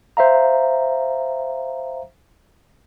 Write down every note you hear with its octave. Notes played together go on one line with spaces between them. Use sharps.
C5 E5 F5 A#5